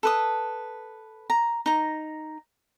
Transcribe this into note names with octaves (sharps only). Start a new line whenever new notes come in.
A4 B4 D#6
A#5
D#4 A#5